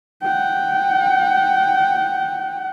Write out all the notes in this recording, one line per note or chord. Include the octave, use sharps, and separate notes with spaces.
F#5 G5